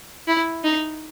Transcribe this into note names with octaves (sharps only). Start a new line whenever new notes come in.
E4
D#4